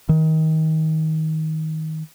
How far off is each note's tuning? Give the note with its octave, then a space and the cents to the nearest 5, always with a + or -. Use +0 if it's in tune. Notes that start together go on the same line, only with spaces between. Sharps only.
D#3 +25